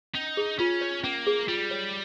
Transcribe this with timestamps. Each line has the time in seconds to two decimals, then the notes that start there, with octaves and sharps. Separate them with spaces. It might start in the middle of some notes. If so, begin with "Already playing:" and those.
0.14 C#4 D#4
0.37 G#4
0.59 C#4 F4
0.81 C#5
1.04 A#3 C#4
1.27 G#4
1.48 G3 F4
1.71 C#5